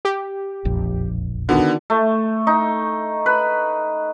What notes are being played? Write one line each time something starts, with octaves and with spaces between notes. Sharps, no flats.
G4
E1 A#1 F2
D3 D#3 B3 D4 F#4
A3
D#4
B4